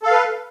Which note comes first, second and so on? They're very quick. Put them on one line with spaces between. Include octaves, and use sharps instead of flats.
A4 F5 B4